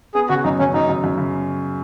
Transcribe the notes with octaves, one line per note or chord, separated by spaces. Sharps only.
B3 G#4
C#3 F#4
F#2 D#4
F#2 C#4
F#2 D#4
F#2
F#2
C#3